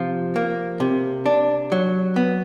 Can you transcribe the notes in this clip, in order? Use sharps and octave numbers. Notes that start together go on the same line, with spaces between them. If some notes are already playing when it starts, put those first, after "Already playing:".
Already playing: C3 F3
A#3
C3
D4
F#3
B3